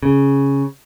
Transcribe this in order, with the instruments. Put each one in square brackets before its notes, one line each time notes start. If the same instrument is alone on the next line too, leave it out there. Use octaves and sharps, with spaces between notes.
[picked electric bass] C#3